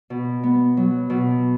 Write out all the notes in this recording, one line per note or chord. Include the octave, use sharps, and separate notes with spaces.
B2
B3
F#3
B2